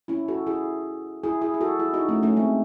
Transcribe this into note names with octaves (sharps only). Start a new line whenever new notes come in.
C#4 E4
F#4 A4
E4 G#4
E4 G#4
E4 G#4
G#4
F#4 A4
E4 G#4
D#4 F#4
A3 C#4
A3 C#4
G#3 C4